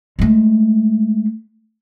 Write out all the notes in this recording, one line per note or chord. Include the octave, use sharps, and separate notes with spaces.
G#3 A3